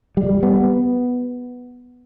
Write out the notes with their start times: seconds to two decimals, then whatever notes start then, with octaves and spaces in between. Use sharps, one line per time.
0.17 G3
0.43 B3